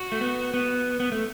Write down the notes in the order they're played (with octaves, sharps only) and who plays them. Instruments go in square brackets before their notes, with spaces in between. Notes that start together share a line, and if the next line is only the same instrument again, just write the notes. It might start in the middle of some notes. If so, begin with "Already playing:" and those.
Already playing: [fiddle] F#4
[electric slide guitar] A3
B3
B3
B3
A3